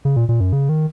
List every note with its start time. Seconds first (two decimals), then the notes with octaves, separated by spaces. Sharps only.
0.05 C#3
0.16 A#2
0.29 A#2
0.40 F#2
0.53 C#3
0.69 D#3